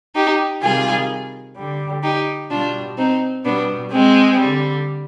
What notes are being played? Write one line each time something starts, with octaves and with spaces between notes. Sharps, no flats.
D#4 G4
C3 D#3 G3 F4 G#4
D3 G3
D#4 G4
B2 G3 D4 F4
C4 D#4
B2 G3 B3 D4
G#3 C4
D3 G3